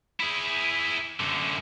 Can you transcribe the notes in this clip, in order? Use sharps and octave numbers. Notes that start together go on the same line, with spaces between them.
E4 G#4
F#2 D3